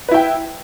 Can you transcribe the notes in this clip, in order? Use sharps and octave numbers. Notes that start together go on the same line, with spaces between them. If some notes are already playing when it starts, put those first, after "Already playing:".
E4 B4 G5